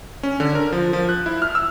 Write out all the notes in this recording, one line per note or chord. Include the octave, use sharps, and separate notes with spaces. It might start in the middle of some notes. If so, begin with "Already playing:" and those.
C#4
D3
A#4
F3
F3
F#6
E4
F6
E6